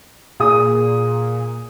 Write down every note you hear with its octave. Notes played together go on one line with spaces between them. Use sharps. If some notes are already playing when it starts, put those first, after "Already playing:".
A#2 G#4 D#6